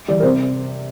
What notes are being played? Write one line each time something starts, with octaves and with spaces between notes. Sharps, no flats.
E3 G3 D5
A#4
C3 C5